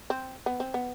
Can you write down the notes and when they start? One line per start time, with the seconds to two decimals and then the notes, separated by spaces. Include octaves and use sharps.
0.10 C4
0.46 B3
0.60 C4
0.74 B3